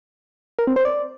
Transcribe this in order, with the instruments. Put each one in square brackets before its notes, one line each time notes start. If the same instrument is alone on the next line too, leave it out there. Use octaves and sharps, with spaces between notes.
[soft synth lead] A#4
C4
C5
D5